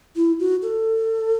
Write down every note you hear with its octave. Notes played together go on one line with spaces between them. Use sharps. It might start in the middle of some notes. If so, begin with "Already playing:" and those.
E4
F#4
A4